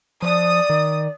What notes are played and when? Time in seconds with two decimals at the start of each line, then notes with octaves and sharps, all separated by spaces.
0.22 F3 D5 D#6
0.70 D#3